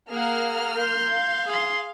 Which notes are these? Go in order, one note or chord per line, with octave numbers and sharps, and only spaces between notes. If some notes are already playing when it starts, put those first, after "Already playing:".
A#3 G#4 F#5 F6
C6 G6
F5
G#4 C6